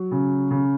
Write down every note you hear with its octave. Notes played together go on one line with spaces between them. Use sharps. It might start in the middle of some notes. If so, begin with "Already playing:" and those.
Already playing: F#3
C#3
C#3